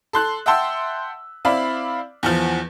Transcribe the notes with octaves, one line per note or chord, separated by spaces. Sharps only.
A4 C6 F#6
E5 F#5 G5 A5 C6 E6
C4 E4 D5 F5 B5
E2 E3 F3